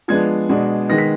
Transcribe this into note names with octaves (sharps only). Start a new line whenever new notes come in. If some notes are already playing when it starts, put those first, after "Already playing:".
F3 G#3 B3 D4 G#6
B2 G#3 D4
D#3 G#3 B3 A#6
B6